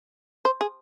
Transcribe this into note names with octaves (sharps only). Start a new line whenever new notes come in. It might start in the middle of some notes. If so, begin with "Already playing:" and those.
C5
G#4